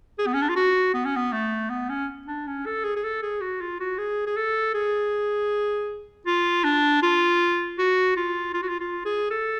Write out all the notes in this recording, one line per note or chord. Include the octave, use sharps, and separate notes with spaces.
G#4
B3
C#4
D4
F4
F#4
B3
C#4
B3
A3
B3
C#4
D4
C#4
A4
G#4
G#4
A4
G#4
F#4
F4
F#4
G#4
G#4
A4
G#4
F4
D4
F4
F#4
F4
F4
F#4
F4
F4
G#4
A4